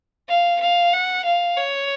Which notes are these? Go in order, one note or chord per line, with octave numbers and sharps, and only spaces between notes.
F5
F5
F#5
F5
C#5